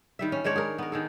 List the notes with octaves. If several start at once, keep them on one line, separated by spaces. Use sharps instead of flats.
D#3 G3 E5
C#4
D#3 G#3 D4 C#5
G#4 A#4
B3 A#4
D#3 G#4 A4